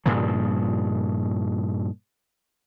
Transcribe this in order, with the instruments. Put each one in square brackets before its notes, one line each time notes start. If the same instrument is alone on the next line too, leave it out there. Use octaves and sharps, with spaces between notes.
[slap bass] G2 A#2 C#3 F3